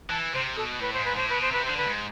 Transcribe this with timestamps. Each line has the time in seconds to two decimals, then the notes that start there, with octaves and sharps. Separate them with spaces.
0.10 E3 A5
0.33 C3 C5
0.56 B2 A4
0.80 A2 B4
0.93 G#2 C5
1.05 B4
1.15 A2 C5
1.29 B2 B4
1.41 C5
1.51 C3 B4
1.65 D3 C5
1.77 B4
1.86 G#2